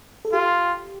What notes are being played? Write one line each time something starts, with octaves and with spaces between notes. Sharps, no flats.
A4
F4 G4